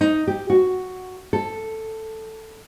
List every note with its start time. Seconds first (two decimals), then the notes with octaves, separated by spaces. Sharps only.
0.01 D#4
0.27 G4
0.50 F#4
1.33 A4